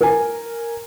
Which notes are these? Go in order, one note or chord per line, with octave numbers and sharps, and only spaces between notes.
A#4 G#5